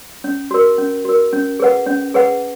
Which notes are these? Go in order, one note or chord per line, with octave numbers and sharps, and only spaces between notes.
C#4
F#4 A#4
C#4
F#4 A#4
C#4
G#4 B4 F#5
C#4
G#4 B4 F#5